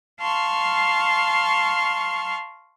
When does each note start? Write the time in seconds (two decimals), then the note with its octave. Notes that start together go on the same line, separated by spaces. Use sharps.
0.21 F5 A5 C6 C#6 F6